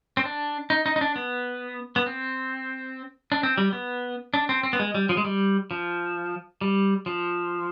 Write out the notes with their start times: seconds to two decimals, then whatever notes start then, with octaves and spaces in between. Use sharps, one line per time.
0.17 C4
0.25 D4
0.70 D#4
0.86 D#4
0.96 D#4
1.01 D4
1.16 B3
1.96 B3
2.06 C4
3.32 D4
3.43 C4
3.58 G3
3.73 B3
4.34 D4
4.49 C4
4.63 C4
4.73 B3
4.79 G#3
4.95 G3
5.09 F3
5.17 G#3
5.25 G3
5.71 F3
6.61 G3
7.06 F3